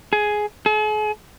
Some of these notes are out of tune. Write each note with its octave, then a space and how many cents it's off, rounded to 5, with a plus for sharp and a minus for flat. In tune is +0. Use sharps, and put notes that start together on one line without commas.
G#4 +10
G#4 +45